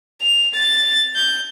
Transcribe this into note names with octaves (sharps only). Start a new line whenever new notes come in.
F7
A6
G6